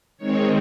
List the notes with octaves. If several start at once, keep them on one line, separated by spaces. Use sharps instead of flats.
D#3 G#3 C4 C#5